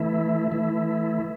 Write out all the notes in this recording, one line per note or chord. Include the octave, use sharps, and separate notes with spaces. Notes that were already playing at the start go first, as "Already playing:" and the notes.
Already playing: E3 A3 E4
E3 A3 E4